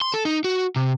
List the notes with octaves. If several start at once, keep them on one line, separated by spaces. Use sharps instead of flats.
C6
A4
D#4
F#4
C3